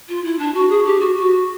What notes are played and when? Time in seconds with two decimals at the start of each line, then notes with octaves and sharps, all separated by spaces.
0.09 F4
0.24 E4
0.39 D4
0.54 F#4
0.69 G#4
0.85 G4
1.00 F#4
1.15 F#4